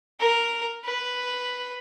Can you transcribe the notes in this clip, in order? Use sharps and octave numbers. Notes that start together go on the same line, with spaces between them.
A#4
B4